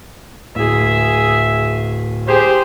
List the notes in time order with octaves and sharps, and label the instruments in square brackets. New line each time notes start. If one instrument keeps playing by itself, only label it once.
[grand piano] D1 [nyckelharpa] G#4 E5
[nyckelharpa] G4 G#4 [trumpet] C5